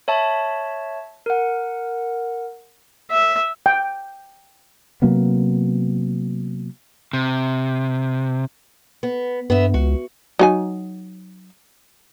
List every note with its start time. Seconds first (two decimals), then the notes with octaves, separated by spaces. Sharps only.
0.08 C#5 E5 A5
1.26 A#4 F#5
3.11 E5
3.66 G5
5.02 C3 F#3 A#3 B3
7.13 C3
9.03 B3
9.50 G2 B3 E5
9.74 C#2 F#4
10.39 F#3 D#4 G#5